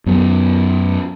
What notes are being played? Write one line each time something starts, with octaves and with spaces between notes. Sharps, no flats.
F#2 B3